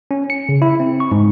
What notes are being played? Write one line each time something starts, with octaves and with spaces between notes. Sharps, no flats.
C#4
C#7
C#3
E4
C4
C#6
G#2